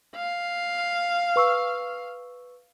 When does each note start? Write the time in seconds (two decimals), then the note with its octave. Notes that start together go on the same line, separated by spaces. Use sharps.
0.15 F5
1.36 B4 C#6 E6